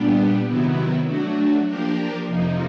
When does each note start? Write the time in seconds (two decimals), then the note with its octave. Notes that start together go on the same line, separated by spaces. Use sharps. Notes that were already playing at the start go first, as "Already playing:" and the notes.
Already playing: A#2 G3 B3 D4 G4
0.46 C3 D#3 F#3 B3 E4
1.06 F#3 A3 D4 F#4
1.67 F3 A#3 D4 G4 A#4
2.27 F2 C3 F3 A#3 D#4